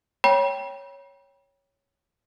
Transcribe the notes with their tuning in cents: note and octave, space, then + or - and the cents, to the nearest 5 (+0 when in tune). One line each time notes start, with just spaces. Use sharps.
C#5 +0 G5 +0 B5 -40